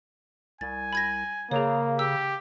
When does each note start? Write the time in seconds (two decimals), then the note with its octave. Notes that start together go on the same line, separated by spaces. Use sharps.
0.61 C2 G#5 A6
0.93 B5 G#6 A#6
1.51 C#3 A#3 G#4 C#5
1.99 G4 E6